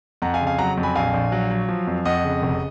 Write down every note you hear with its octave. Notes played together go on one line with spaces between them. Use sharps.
F2 F#5 A#5
F5 G#5
C#3
F5 G#5
F#3 F#5 A#5
F2
G#5 B5
A#1 F5 G#5
A#1
F#3
F#3
F3
F2
F2 D#5 F#5
C#3
F1